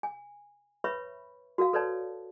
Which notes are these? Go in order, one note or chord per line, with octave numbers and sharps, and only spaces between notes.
G#5
B4 C#5 E5 B5 C#6
F#4 A#4 F5
A4 B4 C#5 D5 A5